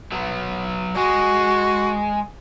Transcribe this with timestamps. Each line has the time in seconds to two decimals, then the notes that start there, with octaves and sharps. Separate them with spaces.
0.12 F#3 B3
0.96 G#3 F#4